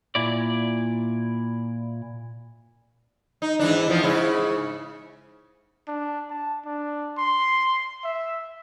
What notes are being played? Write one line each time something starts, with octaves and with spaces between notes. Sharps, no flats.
A#2 E4 D5
D#4
G#2 E3 D4
E2 F3 B3
G#2 C#3 E4
D4
A5
D4
C6
E5